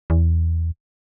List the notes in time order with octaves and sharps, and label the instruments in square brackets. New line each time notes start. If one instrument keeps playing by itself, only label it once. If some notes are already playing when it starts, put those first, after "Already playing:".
[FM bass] E2